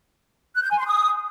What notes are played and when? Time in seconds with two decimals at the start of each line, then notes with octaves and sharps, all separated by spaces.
0.55 F#6
0.63 G6
0.70 G#5
0.78 C6
0.85 D#6